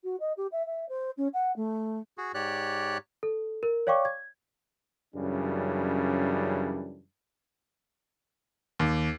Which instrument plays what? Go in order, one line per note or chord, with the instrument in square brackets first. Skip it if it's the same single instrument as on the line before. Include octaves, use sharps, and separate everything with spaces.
[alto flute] F#4
D#5
G4
E5
E5
C5
C#4
F#5
A3
[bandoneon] F#4 G#4
G#2 G4 C#5 D5 F#6
[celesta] A4
A#4
C#5 D5 F5 G5 C#6 D6
G#6
[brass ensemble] F#2 C#3 E3 G3 D4
[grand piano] D#2